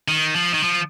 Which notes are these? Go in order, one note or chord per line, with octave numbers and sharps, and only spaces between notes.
D#3
F3
D#3
F3